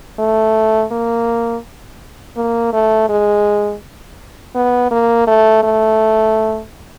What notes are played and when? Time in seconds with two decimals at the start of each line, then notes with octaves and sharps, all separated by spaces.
0.19 A3
0.92 A#3
2.37 A#3
2.73 A3
3.09 G#3
4.55 B3
4.91 A#3
5.28 A3
5.63 A3